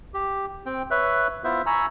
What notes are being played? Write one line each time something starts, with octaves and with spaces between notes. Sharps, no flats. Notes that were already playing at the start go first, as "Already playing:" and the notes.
G4
C4 G5
B4 C#5 E5 F#6
B3 E4 F4 C5 E5
G#5 A#5 B5 C#6 E6